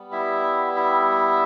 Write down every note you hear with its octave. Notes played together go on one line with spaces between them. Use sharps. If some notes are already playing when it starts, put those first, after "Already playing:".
Already playing: G3 B3
E4 E5
E4 E5